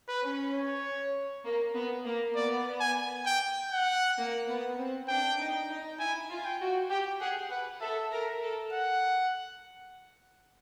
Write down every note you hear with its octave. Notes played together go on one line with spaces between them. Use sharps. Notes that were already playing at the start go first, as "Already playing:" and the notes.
B4
C#4
C#5
A#3
B3
A#3
B3 D5
G#5
G5
F#5
A#3
B3
C4
D4 G5
D#4
D#4
E4 G#5
F4
G5
F#4
G4 G5
G#4 F#5
B4 F#5
A4 E5
A#4
A4
F#5